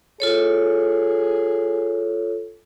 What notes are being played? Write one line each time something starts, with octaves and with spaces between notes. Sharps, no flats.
F4 G#4 A4 C#5